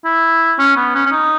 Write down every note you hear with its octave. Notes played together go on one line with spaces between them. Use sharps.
E4
C#4
B3
C#4
C#4
D#4